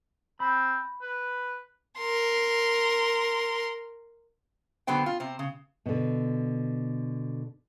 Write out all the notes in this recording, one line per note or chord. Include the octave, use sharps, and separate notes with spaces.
C4 B5
B4
A#4 C6
D3 F#3 B3 F#4 C5 G5
F4
C3 C5
C#3
B2 D3